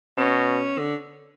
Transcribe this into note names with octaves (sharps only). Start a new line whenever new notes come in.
B2 C#4
D3